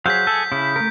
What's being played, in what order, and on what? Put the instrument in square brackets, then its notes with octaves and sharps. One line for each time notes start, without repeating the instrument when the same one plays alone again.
[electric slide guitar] F#3 [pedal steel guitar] G#4 C5 F5 [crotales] G6 B6
[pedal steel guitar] G#4 F#5 G#5 [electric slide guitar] A4
[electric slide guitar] C#3 [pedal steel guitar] E4
[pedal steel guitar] A3 A#4